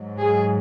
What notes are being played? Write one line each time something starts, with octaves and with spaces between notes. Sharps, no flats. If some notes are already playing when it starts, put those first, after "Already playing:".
Already playing: G#2 F#3
G#4